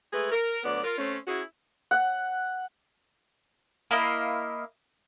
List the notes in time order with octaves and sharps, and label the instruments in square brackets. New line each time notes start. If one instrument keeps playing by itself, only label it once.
[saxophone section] G#3 A3 G#4 B4
A#4
D2 F#3 B3 D5
F4 A#4
A3 C4 C#4
C#4 E4 F#4 G#4
[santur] F#5
[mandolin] A#3 E4 D#5 F5